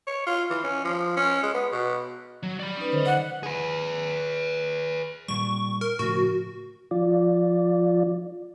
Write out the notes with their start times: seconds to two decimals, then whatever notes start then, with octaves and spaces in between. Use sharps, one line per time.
0.07 C#5
0.27 F4
0.50 E3
0.64 C#4
0.84 F3
1.16 C#4
1.43 G#3
1.54 B3
1.71 B2
2.43 F#3
2.60 D5 B5
2.77 C#4 D#4 B4
2.92 D3 C5 D#5
3.06 F#5
3.43 G#4 B4
5.28 A#2 G3 C#6
5.81 A#4
5.99 A2 C#3 F3 F#4
6.91 F3 F4 D5